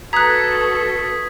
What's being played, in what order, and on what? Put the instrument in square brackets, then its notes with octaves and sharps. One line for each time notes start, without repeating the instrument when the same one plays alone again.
[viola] F#4 B4 [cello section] A4 [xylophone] A#5 F#6 [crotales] D#6 G#6 B6